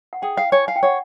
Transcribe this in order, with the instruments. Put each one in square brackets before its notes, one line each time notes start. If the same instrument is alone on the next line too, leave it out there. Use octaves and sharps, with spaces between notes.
[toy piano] F#5
[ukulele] G#4 [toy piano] G5
[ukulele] F5 [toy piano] G5
[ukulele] C#5 [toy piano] G#5
[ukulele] F5 [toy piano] G#5
[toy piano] G5
[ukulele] C#5 [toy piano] F#5